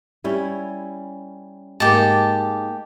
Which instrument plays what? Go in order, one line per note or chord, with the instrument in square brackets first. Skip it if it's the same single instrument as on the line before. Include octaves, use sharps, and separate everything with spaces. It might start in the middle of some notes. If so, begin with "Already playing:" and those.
[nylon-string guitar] G3 C#4 E4
[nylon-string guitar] G#2 A#3 [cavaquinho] G4 A5